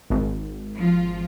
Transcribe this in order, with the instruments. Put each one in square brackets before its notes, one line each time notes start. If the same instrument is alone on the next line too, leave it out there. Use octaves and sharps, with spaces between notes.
[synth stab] G#1
[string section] F3 F4